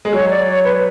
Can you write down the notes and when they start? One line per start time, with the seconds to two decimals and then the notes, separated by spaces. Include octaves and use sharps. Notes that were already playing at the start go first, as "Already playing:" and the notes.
0.05 G#3
0.13 F#3 C#5
0.30 D5
0.47 C#5
0.65 B4